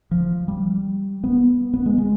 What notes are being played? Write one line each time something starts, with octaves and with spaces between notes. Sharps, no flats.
F3
G3
B3
B3
G#3
G#3